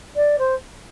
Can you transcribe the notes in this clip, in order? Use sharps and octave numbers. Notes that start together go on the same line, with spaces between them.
D5
C5